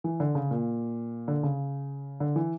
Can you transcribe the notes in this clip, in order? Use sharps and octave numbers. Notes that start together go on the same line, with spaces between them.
E3
D3
C#3
A#2
D3
C#3
D3
E3